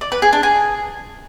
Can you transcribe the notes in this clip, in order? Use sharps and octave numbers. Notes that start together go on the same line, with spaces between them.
D5
B4
G#4
D4
G#4